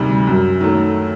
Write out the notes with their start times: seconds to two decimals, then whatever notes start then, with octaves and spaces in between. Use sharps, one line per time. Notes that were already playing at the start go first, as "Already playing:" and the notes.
Already playing: D2 C3 D#3 G3
0.27 F#2
0.60 D#3 F#3 A3